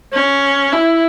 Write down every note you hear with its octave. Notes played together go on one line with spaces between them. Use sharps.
C#4
E4